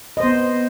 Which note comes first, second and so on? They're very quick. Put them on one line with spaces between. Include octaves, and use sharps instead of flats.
D#5 C5 B3